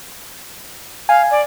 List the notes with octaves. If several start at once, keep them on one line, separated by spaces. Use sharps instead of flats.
F5 G#5
D5